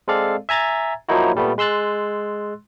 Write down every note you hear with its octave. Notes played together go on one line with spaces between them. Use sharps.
G#3 C4 A4 D5 F5
E5 G#5 A#5 G#6 A6
F3 F#3 A#3 D#4 E4 F#4
A#2 G3 A3 B3
G#3 C6 E6 F#6 A6